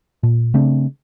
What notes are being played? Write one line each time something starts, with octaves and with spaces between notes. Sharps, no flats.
A#2
C#3 A3 C4 D4